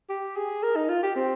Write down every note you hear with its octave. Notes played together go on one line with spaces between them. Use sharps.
G4
G#4
A#4
D#4
F4
G4
C4